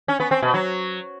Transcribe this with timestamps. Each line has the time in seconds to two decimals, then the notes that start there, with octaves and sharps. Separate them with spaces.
0.08 C#4
0.20 B3
0.31 C4
0.42 B2
0.54 F#3